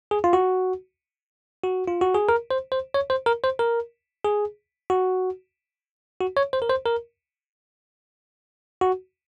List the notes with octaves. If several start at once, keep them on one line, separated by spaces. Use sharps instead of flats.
G#4
F4
F#4
F#4
F4
F#4
G#4
A#4
C5
C5
C#5
C5
A#4
C5
A#4
G#4
F#4
F#4
C#5
C5
A#4
C5
A#4
F#4